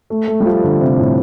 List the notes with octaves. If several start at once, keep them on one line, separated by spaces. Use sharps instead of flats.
A3
A3
G3
F3
D3
C3
A2